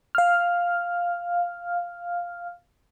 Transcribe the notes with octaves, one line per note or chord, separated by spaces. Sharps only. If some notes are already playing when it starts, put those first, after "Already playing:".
F5 F6